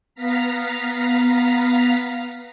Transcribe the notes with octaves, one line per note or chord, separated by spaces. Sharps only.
B3 F5 A#5 B6